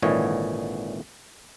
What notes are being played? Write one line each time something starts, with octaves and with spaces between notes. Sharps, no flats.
G#1 A#2 D3 E3 C#5 D#5